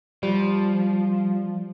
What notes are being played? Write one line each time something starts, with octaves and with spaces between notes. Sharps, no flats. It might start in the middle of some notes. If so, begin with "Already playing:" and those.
F3 G3